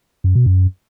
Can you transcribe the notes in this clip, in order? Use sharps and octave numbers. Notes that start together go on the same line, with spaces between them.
F#2
B2
F#2